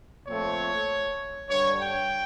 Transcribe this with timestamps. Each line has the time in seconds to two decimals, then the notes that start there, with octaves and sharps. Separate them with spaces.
0.28 A#2 F3 A3 C4 C#5
1.49 G2 D3 G3 C#5
1.81 G5